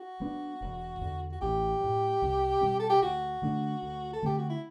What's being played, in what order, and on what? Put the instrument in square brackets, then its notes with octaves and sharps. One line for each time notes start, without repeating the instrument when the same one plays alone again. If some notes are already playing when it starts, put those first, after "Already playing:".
Already playing: [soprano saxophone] F#4
[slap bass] F#3 B3 D4
E1
E2 D3
[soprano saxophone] F#4
[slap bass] A1 [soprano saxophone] G4
[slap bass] A2 F#3
C2
B2 G3 C4
[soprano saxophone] A4
G4
[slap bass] D2 [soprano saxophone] F#4
[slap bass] D3 A3 D4
D2
[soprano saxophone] A4
[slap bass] D3 A3 C4 [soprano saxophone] G4
[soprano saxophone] F#4
E4